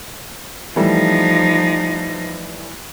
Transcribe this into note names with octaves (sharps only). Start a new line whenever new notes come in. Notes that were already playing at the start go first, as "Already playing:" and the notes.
E3 F3 G3 A3 D#4